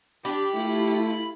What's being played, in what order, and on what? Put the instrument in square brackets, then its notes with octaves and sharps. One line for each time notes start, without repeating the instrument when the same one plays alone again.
[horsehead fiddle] D4 [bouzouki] G4 [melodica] B5
[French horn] A3 [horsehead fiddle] E4 F4